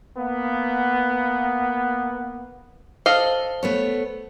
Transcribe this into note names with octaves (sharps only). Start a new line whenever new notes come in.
A#3 B3
A4 C5 D#5 F5
A3 B3 C#5